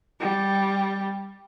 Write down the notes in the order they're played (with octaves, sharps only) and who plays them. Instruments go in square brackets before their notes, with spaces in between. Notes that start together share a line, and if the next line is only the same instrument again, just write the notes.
[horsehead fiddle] G3